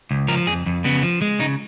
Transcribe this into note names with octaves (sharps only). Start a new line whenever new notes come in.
C#2
F3 A#4
F2 G#4
F2
C#3 B3
F3
G#3
C#3 D#4